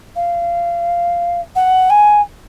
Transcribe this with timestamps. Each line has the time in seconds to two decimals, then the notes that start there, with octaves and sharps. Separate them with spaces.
0.15 F5
1.55 F#5
1.90 G#5